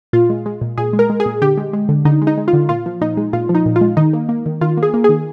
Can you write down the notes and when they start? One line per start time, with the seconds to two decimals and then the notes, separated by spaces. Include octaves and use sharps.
0.13 A#2 F4
0.30 G#3
0.46 G#3
0.61 A#2
0.77 A#2 G#4
0.93 G#3
0.99 A#4
1.10 G#3
1.20 G#4
1.26 A#2
1.42 D3 G4
1.57 G#3
1.73 G#3
1.89 D3
2.05 D3 D#4
2.22 G#3
2.27 D#4
2.37 G#3
2.48 F4
2.53 D3
2.69 A#2 F4
2.86 F3
3.01 A#2 D#4
3.17 G#3
3.33 A#2 F4
3.49 F3
3.55 D#4
3.66 A#2
3.76 F4
3.81 G#3
3.97 D#3 D#4
4.13 A#3
4.29 A#3
4.46 D#3
4.61 D#3 F4
4.77 A#3
4.83 G#4
4.94 A#3
5.04 D#3 G#4